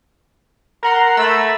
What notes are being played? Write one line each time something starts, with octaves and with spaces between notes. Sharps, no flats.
A#4 F#5 A#5 C6
A3 B5 E6